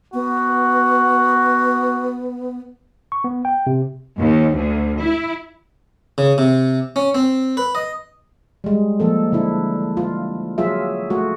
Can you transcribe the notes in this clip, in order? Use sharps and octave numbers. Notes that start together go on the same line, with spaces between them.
B3 F#4
C#6
B3
G5
C3
D#2
D2
E4
C#3
C3
C#4
C4
B4
D#5
G3 G#3
F3 A#3 A4
D3 D4 E4
F4
F#3 F4 G#4 E5
A3 F#4